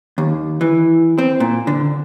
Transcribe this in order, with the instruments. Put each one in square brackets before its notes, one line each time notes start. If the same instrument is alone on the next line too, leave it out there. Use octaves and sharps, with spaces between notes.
[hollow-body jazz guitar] D#2
E3
C4
A#2
D3